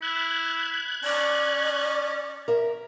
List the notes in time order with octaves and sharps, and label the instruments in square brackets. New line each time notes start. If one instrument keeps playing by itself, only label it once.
[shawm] E4 [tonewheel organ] F#6 G#6
[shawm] C#4 [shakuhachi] D5
[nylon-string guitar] A#4 E5